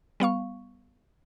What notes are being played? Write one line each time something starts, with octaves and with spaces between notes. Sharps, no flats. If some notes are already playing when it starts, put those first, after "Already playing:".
G3 B3 F5 C#6